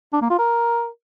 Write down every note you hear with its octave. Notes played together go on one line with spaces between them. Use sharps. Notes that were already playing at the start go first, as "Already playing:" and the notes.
D4
A#3
F4
A#4